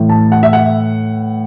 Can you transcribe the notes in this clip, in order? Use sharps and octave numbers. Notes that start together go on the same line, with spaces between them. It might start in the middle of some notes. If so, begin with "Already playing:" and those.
Already playing: A2 E3
A5
F#5
E5
F#5